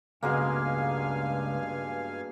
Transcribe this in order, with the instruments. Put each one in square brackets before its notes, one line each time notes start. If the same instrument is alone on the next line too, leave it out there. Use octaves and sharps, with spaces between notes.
[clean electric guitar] C#2 [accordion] G2 F5 G#5 [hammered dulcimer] B2 G#3 A#3